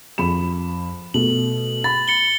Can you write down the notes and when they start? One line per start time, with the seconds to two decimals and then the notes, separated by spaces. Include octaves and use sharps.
0.18 F2 B5 E7
1.14 B2 A3 F#7
1.84 B5 A6
2.08 A6 C#7 G7